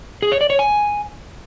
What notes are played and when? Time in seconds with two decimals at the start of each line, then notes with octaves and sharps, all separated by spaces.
0.22 G#4
0.32 C#5
0.41 D5
0.50 C#5
0.59 G#5